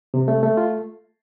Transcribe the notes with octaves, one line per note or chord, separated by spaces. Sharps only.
C3
A3
A3
F4